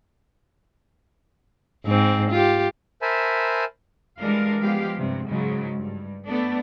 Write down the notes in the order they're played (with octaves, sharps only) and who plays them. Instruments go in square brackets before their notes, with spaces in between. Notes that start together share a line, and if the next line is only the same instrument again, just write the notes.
[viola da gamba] G#2 C4
F4 G4
[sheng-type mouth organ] A#4 C5 E5 G#5 A5 B5
[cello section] E3 G3 G#3 D4 A#4 F5
F3 G#3 B3 G4 F5
G2 C3
G#2 C#3 F#3 G#3
G2
A3 B3 D4 A4